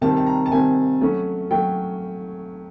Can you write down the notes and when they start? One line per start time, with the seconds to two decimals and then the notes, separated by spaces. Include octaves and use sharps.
0.01 C3 D#3 G3 C4 A5
0.17 A5
0.27 A#5
0.46 A5
0.51 C3 D#3 G3 C4 G#5
1.01 F#3 A3 C#4
1.51 F#3 A3 G5